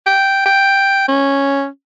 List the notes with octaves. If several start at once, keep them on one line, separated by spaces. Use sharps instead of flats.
G5
G5
C#4